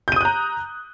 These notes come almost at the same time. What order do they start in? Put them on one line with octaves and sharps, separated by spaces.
G6 D#7 D#6 F#6 A#5